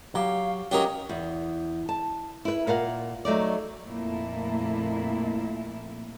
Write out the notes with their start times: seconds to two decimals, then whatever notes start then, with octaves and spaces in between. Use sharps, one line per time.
0.15 F#3 G4 F5
0.71 F#3 C#4 F#4 G4 A#4 C#5 D#5 D6
1.09 E2
1.89 A5
2.45 E4 B4
2.67 A#2 A#4 F5 F#5
3.25 F#3 A3 D#4 D5
3.87 F2 A#2 A3 A#3 E4